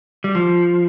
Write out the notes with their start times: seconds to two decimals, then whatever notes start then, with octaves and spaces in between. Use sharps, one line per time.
0.24 G3
0.35 F3